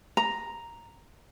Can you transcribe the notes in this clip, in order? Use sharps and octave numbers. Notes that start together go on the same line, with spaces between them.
A#5